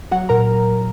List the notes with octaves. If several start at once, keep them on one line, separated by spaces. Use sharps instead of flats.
F#3 F#4 F#5
A#2 A#4 A#5